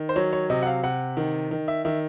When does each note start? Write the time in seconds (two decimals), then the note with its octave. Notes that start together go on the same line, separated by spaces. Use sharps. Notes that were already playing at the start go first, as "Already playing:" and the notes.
Already playing: D#3
0.09 C5
0.16 F#3 C#5
0.33 C#5
0.50 C3 D#5
0.62 F#5
0.67 F5
0.83 C3 F#5
1.17 D#3
1.51 D#3
1.68 E5
1.85 D#3 E5